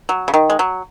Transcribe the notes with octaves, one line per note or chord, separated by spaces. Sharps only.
F#3
C#3
D#3
G#3
F#3